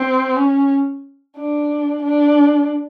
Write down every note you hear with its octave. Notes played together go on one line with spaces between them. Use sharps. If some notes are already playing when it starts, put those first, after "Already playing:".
Already playing: C4
C#4
D4
D4